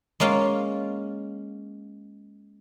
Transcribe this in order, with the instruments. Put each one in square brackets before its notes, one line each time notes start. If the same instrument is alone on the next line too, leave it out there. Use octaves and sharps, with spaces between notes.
[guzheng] G#3 A#3 C#4 F4